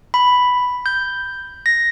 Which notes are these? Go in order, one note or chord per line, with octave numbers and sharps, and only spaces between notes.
B5
G6
A#6